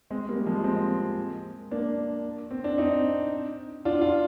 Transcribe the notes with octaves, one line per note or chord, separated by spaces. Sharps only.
G#3 C4
G3 A#3
F3 G#3
G#3 C4
A#3 D4
C4
D4
C4 D#4
D4 F4
F4